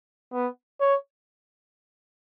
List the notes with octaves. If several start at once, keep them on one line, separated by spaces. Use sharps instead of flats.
B3
C#5